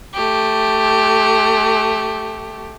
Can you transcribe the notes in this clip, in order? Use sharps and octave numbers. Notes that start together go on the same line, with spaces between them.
A3 G4